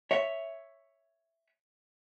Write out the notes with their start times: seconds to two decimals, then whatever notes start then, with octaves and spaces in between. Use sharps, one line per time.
0.11 C#5 E5